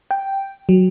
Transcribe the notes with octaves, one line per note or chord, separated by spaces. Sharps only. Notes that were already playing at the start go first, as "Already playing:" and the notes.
G5
F#3